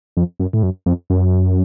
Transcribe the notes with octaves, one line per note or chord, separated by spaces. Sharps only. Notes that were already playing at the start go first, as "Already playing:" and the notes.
F2
F#2
A2
F#2
F2
F#2